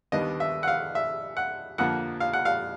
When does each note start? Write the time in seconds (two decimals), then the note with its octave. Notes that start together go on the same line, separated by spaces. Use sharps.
0.12 D#2 D#3 G3 B3 D4 D#5
0.40 E5
0.63 F#5
0.68 F5
0.95 E5
1.37 F#5
1.78 F2 D3 F3 A#3 F#5
2.20 F5
2.33 F#5
2.45 F5